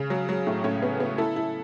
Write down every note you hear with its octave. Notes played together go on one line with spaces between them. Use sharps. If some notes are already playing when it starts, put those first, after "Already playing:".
Already playing: C#3
F#3
F#3
A2
A2 C#4 C#5
B3
B3
E4 A4
E4